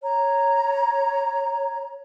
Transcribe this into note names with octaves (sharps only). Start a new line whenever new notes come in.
C#5 A#5